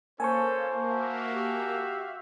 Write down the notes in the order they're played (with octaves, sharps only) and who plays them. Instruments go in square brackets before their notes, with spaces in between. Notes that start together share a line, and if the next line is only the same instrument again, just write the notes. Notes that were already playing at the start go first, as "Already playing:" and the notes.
[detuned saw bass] A#3 [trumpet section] C#4 F4 A4 [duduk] C5 [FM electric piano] G#5 A5 C#6
[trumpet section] F#4 E5 F5
[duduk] G4